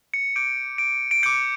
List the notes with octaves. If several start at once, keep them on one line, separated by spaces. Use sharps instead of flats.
C#7
D6 G6 D7
D7
D7
D6 G6 C#7